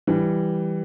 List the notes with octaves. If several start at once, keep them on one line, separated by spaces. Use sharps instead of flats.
E3 G3